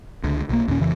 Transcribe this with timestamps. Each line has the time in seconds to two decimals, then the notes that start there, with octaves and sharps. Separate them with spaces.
0.24 C#2 D3
0.49 B1 A#3
0.68 D#2 A#2 C#4
0.80 F2 C#3 E3